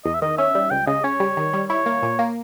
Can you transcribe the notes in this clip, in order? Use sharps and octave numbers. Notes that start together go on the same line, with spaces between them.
E2 D#5
E5
D#3 D#5
C#4 E5
G3
C#2 G5
C#3 D#5
C#4 C#5
G3
D#3
G3
E4 C#5
A#3
A#2
A#3